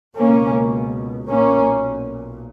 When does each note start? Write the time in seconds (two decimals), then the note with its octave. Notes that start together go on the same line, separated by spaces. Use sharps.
0.16 C#2 B2 A#3 C#4
1.28 B1 A#2 A#3 C#4